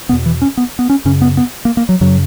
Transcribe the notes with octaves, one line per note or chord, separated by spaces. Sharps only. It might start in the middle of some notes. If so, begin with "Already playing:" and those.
E2 B2 B3
E3
C#4
B3
B3
C#4
F#2 C#3 C#4
B3
B3
A#3
A#3
F#3
F#2 C#3 F#3